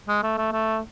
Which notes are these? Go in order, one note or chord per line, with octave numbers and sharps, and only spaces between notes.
G#3
A3
A3
A3